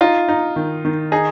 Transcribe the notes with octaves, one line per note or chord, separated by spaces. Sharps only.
D#4 F4
D#4
D#3
D#3
D#4 G#4